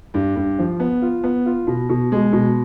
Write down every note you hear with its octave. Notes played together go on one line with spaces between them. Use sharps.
G2
G2
F3
B3
F4
B3
F4
B2
B2
G#3
B2